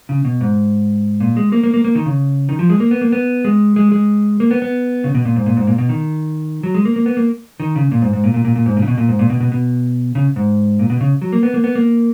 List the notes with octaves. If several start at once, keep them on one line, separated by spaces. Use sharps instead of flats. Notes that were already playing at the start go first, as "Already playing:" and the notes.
C#3
B2
G#2
A#2
G#3
A#3
A#3
A#3
A#3
D#3
C#3
D#3
F3
G#3
A#3
B3
A#3
B3
G#3
G#3
G#3
A#3
B3
B3
C#3
B2
A#2
G#2
A#2
G#2
A#2
B2
D#3
F#3
G#3
A#3
A#3
B3
A#3
D#3
C#3
A#2
G#2
G#2
A#2
A#2
A#2
A#2
G#2
A#2
C#3
B2
A#2
G#2
A#2
B2
B2
B2
C#3
G#2
A#2
B2
C#3
F#3
A#3
B3
A#3
B3
A#3